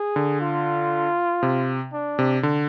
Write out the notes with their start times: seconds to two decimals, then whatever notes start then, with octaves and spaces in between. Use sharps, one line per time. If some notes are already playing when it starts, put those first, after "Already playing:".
Already playing: G#4
0.16 D3
0.41 F4
1.43 C3
1.93 D4
2.19 C3
2.43 D3